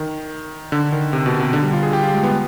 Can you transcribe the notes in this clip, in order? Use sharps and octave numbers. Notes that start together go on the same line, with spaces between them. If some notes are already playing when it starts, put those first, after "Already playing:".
Already playing: D#3
D3
D#3
C3
B2
C3
D3
G3
F4
G#4
G4
F4
G#3
B3